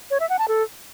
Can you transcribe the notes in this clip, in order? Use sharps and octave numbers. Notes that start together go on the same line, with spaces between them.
C#5
E5
F#5
A5
A4